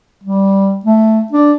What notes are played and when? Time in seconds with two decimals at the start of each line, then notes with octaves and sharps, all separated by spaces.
0.23 G3
0.85 A3
1.32 D4